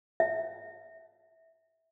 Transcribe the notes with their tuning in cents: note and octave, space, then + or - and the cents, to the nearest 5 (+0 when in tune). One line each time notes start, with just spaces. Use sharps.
E5 -20